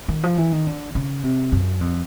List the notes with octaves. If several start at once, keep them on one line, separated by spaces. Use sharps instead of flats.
D#3
F3
E3
D#3
D3
C#3
C3
F#2
F2